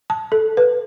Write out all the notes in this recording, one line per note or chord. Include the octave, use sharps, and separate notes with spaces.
A5
A4
B4